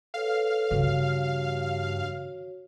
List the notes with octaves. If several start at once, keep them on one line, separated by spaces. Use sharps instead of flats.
A4 B4 C#5 F5
G2 C#3 E3 F#4 C#5